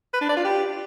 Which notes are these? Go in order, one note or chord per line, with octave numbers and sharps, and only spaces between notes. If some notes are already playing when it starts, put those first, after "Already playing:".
B4
D4
D5
F4
G4